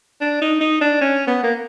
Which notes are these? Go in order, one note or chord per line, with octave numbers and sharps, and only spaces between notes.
D4
D#4
D#4
D4
C#4
B3
A#3